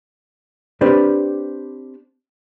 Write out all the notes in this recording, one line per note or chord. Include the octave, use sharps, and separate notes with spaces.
C4 D4 G4 B4 C5 D5